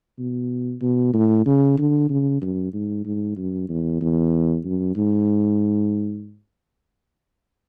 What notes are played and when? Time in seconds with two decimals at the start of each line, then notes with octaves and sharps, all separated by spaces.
0.19 B2
0.82 B2
1.14 A2
1.46 C#3
1.78 D3
2.10 C#3
2.42 F#2
2.73 G#2
3.05 G#2
3.37 F#2
3.69 E2
4.01 E2
4.65 F#2
4.96 G#2